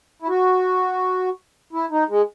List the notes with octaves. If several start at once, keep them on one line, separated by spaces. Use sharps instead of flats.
E4
F#4
E4
D#4
G#3